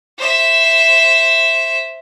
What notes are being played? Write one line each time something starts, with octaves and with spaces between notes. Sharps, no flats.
C5 E5